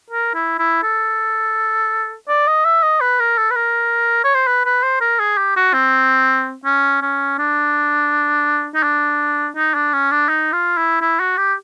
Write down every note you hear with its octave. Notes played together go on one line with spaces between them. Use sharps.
A#4
E4
E4
A4
D5
D#5
E5
D#5
B4
A#4
A4
B4
A#4
C#5
C5
B4
B4
C5
A#4
G#4
G4
F#4
C4
C#4
C#4
D4
D#4
D4
D#4
D4
C#4
D4
D#4
F4
E4
E4
F#4
G4